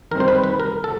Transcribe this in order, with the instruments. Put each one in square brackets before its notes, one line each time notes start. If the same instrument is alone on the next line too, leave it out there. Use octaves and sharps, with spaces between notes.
[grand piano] D#3 G3 C4 D#4 [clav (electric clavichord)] A#4
[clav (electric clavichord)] C5
B4
B4
A#4
A4